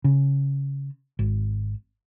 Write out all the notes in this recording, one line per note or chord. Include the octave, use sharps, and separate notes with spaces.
C#3
G#1